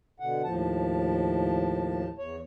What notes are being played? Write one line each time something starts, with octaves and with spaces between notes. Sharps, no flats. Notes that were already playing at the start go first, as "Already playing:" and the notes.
B2 D3 F#5
D#2 A2 F3 A5
E2 C#5